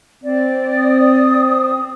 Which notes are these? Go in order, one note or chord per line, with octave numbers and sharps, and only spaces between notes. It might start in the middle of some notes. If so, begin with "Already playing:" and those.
C4 D5
D#6